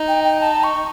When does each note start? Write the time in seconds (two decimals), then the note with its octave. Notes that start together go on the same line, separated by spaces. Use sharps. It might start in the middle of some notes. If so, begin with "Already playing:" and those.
Already playing: D#4
0.08 G5
0.24 G5
0.41 A5
0.64 C#6